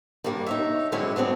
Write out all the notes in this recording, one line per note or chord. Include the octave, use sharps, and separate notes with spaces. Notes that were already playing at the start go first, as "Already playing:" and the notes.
G2 C#3 G3 A#3 C#4 D4
D#4 C#5 E5
D3 F#3 G#3 C4 C#4 E4
F#3 B3 C4 D4